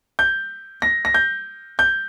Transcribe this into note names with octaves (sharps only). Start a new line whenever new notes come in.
G6
A#6
A#6
G6
G6